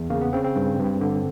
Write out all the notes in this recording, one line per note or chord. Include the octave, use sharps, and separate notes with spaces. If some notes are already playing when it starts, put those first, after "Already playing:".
Already playing: E2
C#3 A#3
B3
C#3 C4
C4
G2
G2
D3